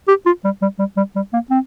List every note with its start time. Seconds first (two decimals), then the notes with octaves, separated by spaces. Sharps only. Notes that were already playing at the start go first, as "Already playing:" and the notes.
0.08 G4
0.26 F4
0.44 G3
0.62 G3
0.79 G3
0.97 G3
1.16 G3
1.33 A#3
1.51 C4